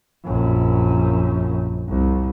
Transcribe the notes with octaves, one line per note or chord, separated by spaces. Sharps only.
A#1 F#2
C2